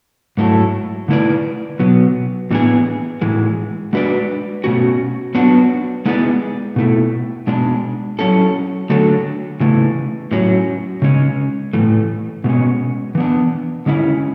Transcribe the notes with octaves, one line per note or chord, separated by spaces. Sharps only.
G#2 F#3 A3 E4 A4
D3 A3 E4 B4 D5
B2 F#3 B3
A2 E3 B3 D4 G#4
A2 E3 G#3
G#3 D4 F#4 B4 D5
B2 A3 C#4 F#4
F#3 B3 D4 F#4
G#3 B3 E4 G#4 D5
B2 A3 E4
B2 G#3 D4
F#3 C#4 E4 A4
D3 F#3 A3 D4 A4
C#3 E3 A3
A2 F#3 C#4
C#3 G#3 C#4
A2 E3 A3
B2 G#3 C#4
E3 B3 D4
D3 G#3 C#4 E4